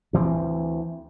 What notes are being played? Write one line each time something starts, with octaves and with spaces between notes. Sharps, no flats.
D2 E3 C4